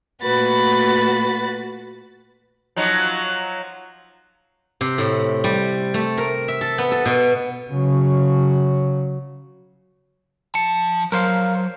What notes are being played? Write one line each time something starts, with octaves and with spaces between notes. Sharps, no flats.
A#2 A3 F#4 B4 B5 A6
F3 F#3 D#4
C3
A2
G3
A3
A#4
E5
A4
B3
A4
B2
C#3 F#3
F3 A5 C#7
F#3 A#4 C5 F5